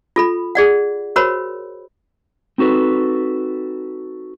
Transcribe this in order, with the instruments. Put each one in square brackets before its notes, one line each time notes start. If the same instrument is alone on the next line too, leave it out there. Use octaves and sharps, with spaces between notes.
[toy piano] F4 A4 B5
G#4 D5 F#5
F#4 A#4 C5 C#5 B5
[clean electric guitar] C4 D#4 F#4 A4 B4